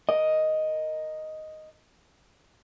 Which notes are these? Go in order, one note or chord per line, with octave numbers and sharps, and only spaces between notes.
A#4 D#5